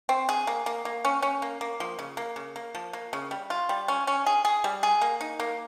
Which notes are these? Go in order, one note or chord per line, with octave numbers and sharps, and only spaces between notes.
C4
G#4
A#3
A#3
A#3
C#4
C#4
A#3
A#3
F3
C#3
A#3
C#3
A#3
F3
A#3
C#3
G3
F4
G3
C#4
C#4
G#4
G#4
G3
G#4
A#3
D#4
A#3